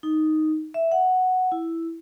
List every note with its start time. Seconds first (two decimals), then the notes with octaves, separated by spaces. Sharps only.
0.03 D#4
0.74 E5
0.92 F#5
1.52 E4